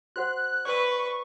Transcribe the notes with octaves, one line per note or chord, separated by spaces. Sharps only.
F#4 C5 F#5 F#6
B4 D5 C#6 E6